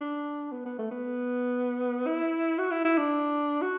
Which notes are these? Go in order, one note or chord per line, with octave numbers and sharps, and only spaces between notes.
D4
B3
B3
A3
B3
E4
F#4
E4
E4
D4
F#4